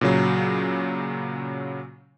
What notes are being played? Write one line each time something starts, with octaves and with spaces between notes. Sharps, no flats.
A#2 C#3 F#3